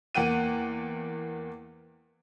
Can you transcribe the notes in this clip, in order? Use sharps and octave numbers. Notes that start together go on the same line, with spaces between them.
E2 A#3 F#5 G5 D#7